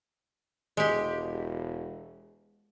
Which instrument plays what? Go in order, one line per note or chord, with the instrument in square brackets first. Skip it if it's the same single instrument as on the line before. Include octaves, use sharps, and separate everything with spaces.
[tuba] E1 [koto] G#3 G4